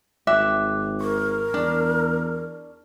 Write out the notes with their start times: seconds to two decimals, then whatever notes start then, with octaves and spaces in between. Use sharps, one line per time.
0.27 G#1 E5 G5 D6 F#6
1.01 A#4 C#6
1.54 E2 D4